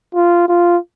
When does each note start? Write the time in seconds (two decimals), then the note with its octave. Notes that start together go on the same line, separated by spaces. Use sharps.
0.15 F4
0.48 F4